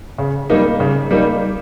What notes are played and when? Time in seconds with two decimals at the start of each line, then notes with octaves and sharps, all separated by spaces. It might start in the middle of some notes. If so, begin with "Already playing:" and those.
0.18 C#3
0.50 G3 A#3 D#4
0.80 C#3
1.11 G3 A#3 D#4